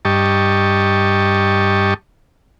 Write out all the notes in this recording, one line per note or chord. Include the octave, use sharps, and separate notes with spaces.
G2 G4 D#5 A5 C#6